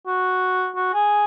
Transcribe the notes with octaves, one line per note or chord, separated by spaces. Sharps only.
F#4
F#4
G#4